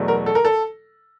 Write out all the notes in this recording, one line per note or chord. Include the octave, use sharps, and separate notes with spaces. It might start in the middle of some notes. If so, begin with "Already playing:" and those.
Already playing: E2 B2 F#3 A3
A#4
A4
A#4
A4